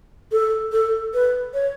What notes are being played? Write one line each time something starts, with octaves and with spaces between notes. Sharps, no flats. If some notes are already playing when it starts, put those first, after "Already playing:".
A4
A4
B4
C#5